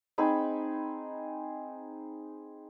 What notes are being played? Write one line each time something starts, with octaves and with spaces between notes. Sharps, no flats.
C4 D#4 G#4 B5